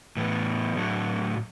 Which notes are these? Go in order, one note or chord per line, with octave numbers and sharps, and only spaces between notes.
A2 E3 B3
A2 F#3 A3 D4 F#4